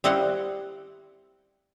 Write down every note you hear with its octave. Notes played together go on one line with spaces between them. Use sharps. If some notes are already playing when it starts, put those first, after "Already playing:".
G3 C4 E4 D#5 F5 F#5